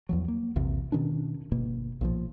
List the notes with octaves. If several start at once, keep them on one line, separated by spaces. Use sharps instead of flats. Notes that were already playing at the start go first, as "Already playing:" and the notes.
E2 F3 F#3
A#3
A#1 E2 C3
B2 D#3 C#4 D4
G1 B2 A#3
B1 A#2 F3